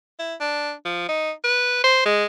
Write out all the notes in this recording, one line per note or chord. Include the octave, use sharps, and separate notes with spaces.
E4
D4
F3
D#4
B4
C5
G#3